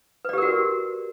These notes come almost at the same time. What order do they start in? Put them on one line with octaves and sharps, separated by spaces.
B4 D5 G4 A#4 F#4